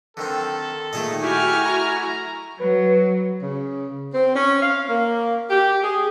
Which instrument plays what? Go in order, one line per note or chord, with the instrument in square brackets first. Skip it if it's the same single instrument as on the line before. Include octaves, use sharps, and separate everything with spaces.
[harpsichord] D3 D#3 C4 [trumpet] A4
[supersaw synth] A#2 D#3 [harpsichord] A3 G#4 D#5
[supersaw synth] E4 F#4 [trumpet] G4 [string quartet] G#5 C#6 F6
[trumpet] A#5
[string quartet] F#3 [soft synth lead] B4
[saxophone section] C#3
C4
C#4
F5
A#3
G4
G#4